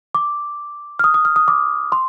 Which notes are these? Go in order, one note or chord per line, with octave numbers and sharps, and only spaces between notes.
D6
F6
D#6
D#6
F6
D#6
D6
C6